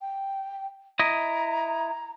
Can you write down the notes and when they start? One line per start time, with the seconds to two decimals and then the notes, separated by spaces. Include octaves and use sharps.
0.01 G5
0.99 E4 D#5 A#5